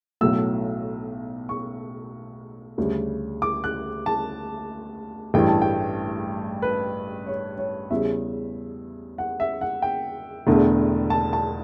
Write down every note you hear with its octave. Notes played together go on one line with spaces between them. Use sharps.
B1 A2 F#3 A3 E6
C#6
D2 C#3 G3
D6
F#6
A5
A1 G2 E3 A3 G5
A5
G5
B4
C#5
C#5
E2 C#3 G3 E5
F#5
E5
F#5
G5
E1 E2 D3 A3
A5
A5